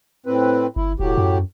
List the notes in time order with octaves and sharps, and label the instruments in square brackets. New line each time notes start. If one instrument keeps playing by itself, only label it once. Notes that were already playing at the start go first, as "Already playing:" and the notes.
[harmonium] A2 C4 B4
[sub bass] G1 [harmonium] E4
[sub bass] E1 [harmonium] A2 F#3 G4
[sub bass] F#2